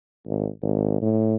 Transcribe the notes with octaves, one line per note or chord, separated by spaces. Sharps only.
G#1
G#1
A2